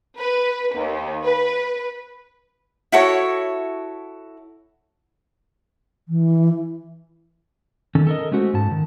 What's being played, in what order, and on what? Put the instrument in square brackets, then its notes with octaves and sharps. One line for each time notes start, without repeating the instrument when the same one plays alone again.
[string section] B4
D#2
B4
[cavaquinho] E4 F#4 A4 C#5
[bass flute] E3
[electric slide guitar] D#3 C#4 A4
A4 A#4 D#5
G#3 A3 C#4 F#4 C5
G#2 A5
D#3